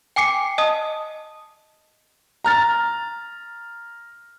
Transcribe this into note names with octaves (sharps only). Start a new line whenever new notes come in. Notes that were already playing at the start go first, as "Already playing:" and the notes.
G5 G#5 D6 C7 C#7
D#5 A5 D#6
A#5 F6 A6